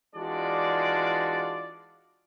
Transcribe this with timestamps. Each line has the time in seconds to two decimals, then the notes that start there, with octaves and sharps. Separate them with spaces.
0.16 E3 G#3 D4 F4 F#4 D5